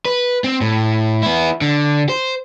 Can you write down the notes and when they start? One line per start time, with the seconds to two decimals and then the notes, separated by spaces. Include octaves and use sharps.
0.05 B4
0.44 C4
0.61 A2
1.23 B3 E4
1.61 D3
2.09 C5